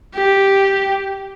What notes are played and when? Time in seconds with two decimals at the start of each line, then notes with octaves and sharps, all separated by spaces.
0.15 G4